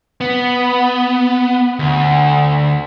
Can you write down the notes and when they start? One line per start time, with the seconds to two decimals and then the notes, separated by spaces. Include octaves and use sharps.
0.21 B3
1.79 D2